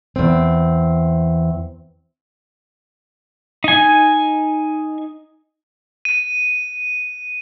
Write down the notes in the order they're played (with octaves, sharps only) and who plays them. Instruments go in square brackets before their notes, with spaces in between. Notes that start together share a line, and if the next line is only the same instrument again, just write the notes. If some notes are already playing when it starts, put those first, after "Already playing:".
[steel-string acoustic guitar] E2 C4
[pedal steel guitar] D#4 G#5
[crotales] D#7